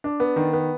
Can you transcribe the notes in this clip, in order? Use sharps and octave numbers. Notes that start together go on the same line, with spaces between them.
D4
B3
D#3
B3